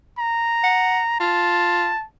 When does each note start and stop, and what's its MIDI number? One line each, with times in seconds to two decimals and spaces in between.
0.19 1.18 82
0.63 1.00 78
1.20 1.92 65
1.20 2.05 81